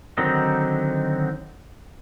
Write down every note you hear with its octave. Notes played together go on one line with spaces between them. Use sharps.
D3 D#3 F#3 C4 D#4